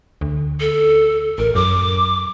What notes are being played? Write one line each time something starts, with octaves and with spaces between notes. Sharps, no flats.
D2
A4
A1 A#4
F#2 D6